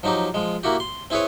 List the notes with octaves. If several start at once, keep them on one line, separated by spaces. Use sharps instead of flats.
F3 F#3 D#4 G4
F3 G#3
A#3 E4 F#4 G4
C6
C4 E4 G#4 B4 C#5